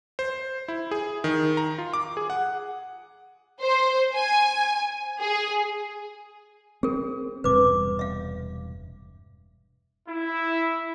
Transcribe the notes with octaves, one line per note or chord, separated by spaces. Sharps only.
C5
E4
G#4
D#3
A#5
F4
D6
G#4
F#5
C5
G#5
G#4
C4 G#4 A#4
E1 G2 C3 B4 D6
E5 F5
E4